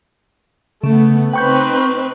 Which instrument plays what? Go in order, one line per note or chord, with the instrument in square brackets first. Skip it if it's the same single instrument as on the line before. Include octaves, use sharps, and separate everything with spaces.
[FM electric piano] C#3 [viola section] A3 B3
[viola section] C4 D#4 B4 [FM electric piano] G5 C#6 G6